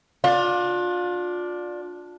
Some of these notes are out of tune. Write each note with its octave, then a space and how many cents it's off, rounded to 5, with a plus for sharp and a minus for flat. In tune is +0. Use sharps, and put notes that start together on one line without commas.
D4 +0 F4 +30